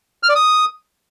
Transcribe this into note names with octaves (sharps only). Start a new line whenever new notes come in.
F6
D5
D#6